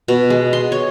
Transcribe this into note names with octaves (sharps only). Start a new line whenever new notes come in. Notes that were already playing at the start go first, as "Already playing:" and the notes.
B2
G#3
C6
C#5